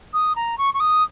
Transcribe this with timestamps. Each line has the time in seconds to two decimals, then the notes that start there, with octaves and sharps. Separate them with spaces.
0.13 D#6
0.35 A#5
0.58 C#6
0.74 C#6
0.80 D#6